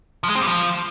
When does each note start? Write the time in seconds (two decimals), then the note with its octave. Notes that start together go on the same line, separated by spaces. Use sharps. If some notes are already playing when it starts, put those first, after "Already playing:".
0.24 F3
0.30 G#3
0.36 C4
0.41 G3
0.47 F3